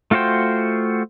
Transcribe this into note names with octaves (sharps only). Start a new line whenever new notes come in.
A3 F4 F#4 C5 G5